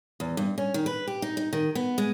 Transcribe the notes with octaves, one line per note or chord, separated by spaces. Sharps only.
E2
G2
C#4
D#3
B4
G4
D#4
D#4
D#3
B3
G#3